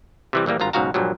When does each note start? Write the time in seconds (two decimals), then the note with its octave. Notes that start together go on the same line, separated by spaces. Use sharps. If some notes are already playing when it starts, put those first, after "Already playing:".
0.33 C3 E3 G3
0.46 A#1 E3 G3 A#3
0.60 G#1 G2 F4 A#5
0.73 B1 G#2 C#3 F#4 F5 A#5
0.94 A#1 G2 A#2 F#3